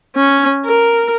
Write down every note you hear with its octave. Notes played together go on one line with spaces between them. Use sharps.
C#4
A#4